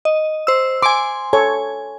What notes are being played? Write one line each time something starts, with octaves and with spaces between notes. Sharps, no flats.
D#5
C5 E6
G#5 C6 D6
A4 C#5 G#5